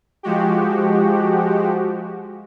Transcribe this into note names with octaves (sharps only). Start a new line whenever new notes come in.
F3 G#3 F#4 G4